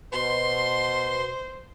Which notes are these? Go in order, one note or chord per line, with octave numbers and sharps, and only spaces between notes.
B2 C5 C6